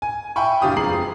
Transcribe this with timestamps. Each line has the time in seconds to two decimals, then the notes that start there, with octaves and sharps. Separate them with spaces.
0.02 G#5
0.36 E5 G5 G#5 B5 C#6
0.62 F#1 D4 G4 F5 D#6
0.76 E1 F2 G#4 A#5 C7 F#7